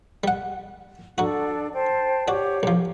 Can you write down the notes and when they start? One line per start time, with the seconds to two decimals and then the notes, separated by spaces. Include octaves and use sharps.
0.24 G3 F#5
1.18 F#3 D4 F#4 A4
1.74 C5 G5 A5
2.28 F#4 G4 C#5 D5
2.63 B1 F3